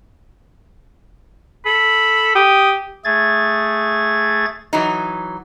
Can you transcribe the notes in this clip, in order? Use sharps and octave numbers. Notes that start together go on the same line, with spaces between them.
A4 B5
G4 D#6
A3 G#4 G#6 A6
E3 F#3 D#4